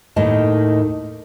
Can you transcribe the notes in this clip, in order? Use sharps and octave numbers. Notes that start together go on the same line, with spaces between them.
D#2 A2 D#3 D#5 A5